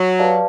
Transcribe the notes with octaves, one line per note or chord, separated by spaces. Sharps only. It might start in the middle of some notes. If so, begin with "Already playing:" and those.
Already playing: F#3
G4 B4 D5 F5 A5